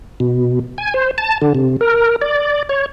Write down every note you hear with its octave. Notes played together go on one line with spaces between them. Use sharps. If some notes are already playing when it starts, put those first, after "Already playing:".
B2
G#5
C5
A5
D3
C3
A#4
D5
C#5